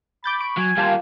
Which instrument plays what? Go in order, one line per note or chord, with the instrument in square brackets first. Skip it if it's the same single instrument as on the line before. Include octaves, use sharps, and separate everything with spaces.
[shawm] B5 [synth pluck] D6 G6 A6
[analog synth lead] C#6 [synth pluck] D7
[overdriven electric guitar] F#3 [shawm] G#5
[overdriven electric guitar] G3 A#3 [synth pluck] F4 G4 A5 [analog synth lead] F5